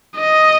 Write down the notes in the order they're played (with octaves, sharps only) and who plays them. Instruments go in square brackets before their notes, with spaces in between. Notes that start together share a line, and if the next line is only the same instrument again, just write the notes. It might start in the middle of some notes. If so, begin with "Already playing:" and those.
[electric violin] D#5